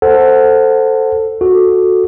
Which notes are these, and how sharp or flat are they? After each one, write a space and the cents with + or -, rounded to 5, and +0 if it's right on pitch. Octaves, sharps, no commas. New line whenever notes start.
A4 +15 C5 +0 F#5 +0
F#4 -10 A4 +0